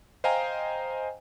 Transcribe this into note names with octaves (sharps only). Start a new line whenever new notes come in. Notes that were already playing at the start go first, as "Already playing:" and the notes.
C5 D#5 F5 G5 G#5 A#5